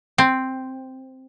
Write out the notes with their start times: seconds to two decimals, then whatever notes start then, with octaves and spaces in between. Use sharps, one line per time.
0.18 C4